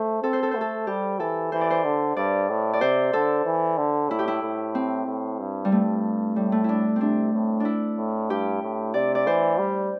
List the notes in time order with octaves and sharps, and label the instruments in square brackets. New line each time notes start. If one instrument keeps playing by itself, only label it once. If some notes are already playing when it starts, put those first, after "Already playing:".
Already playing: [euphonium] A3 [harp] C5
[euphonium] C4 [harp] A4
[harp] C5
A4
[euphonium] A3 [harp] C5
[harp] A4
[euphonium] G3 [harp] G4
[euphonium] E3 [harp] A4
[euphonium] E3 [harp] C5
[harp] D5
C5
[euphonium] D3
[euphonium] G2 [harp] D5
[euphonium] A2
[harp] D5
[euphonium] C3 [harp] C5
[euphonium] D3 [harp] A4
[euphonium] E3
D3
[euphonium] A2 [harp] E4
[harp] G4
E4
[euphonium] A2
[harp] C4
[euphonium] A2
G2
[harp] G3
[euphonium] G2 [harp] A3
[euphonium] A2 [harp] G3
[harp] A3
D4 E4
[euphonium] C3 [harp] C4 D4
[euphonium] A2
[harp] D4 E4
[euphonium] A2
[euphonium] G2 [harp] G4
[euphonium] A2
[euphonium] C3 [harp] D5
[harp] D5
[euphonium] E3 [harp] C5
[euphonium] G3